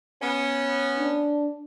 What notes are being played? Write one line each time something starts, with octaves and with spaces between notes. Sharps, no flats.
B3 C#4
D4